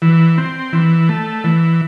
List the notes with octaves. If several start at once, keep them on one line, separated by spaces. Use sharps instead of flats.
E3
C4
E3
A3
E3